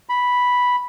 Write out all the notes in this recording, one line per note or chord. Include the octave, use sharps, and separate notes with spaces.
B5